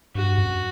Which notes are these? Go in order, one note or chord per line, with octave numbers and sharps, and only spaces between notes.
G2 F#4
F#2